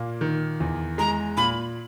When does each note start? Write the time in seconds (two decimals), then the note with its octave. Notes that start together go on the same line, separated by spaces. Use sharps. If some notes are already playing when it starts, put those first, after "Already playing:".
Already playing: A#2 A#3
0.21 D#3
0.60 E2
0.98 G#3 A#5
1.37 A#2 B5